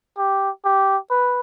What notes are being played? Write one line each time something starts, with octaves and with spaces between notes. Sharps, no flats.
G4
G4
B4